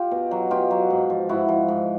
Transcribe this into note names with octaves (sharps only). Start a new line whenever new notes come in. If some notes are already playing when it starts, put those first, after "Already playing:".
Already playing: F4 G4
B2
F#3
B2 F4 G4
F#3
G#2
F3
G#2 E4 F#4
F3
G#2